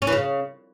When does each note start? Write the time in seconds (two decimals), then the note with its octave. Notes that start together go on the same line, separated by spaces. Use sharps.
0.02 C#4
0.07 E3
0.13 C#3